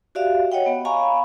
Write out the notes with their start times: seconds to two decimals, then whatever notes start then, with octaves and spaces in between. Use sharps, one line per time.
0.15 F#4 G4 D5 E5 F5
0.52 C#5 D#5 F#5 G5
0.66 B3
0.85 F5 G#5 A#5 B5 C#6